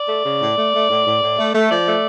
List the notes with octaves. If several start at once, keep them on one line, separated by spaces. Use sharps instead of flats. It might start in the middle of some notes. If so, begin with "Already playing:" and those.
Already playing: D5
A3
C#3
A2
A3
A3
A2
A2
A2
A3
A3
F3 D5
A3